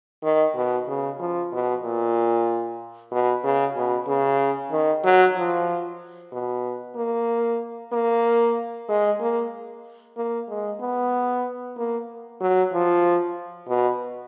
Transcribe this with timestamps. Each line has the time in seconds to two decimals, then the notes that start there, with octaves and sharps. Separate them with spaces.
0.23 D#3
0.56 B2
0.87 C#3
1.19 F3
1.52 B2
1.83 A#2
3.12 B2
3.44 C#3
3.76 B2
4.07 C#3
4.72 D#3
5.04 F#3
5.36 F3
6.32 B2
6.96 A#3
7.92 A#3
8.88 G#3
9.20 A#3
10.17 A#3
10.49 G#3
10.81 B3
11.77 A#3
12.41 F#3
12.73 F3
13.68 B2